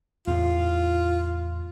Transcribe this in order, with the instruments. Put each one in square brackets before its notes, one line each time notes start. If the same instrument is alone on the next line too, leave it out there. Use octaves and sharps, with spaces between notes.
[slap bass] E2 A2 [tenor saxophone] F4